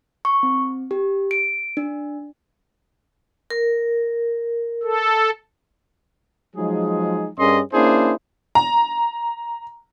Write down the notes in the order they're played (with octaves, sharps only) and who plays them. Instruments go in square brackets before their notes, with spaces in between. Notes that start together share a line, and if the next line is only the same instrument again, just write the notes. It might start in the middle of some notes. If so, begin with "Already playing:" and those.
[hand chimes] C#6
C4
G4
D7
D4
[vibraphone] A#4
[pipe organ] A4
[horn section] F3 F#3 G#3 D#4 G#4
G2 C#4 G#4 A#4 D#5 C6
A#3 C#4 D4 E4 G#4 C5
[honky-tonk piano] A#5